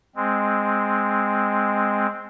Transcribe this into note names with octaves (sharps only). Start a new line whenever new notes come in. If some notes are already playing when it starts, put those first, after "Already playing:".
G#3 C4